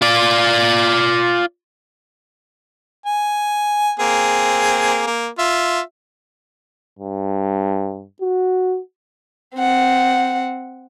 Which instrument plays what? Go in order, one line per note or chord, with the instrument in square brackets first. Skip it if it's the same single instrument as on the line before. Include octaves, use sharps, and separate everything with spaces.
[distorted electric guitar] F4 D5
[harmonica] G#5
A#3 C4 G#4
A#3
F4 E5
[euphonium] G2
F#4
[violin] C4 F#5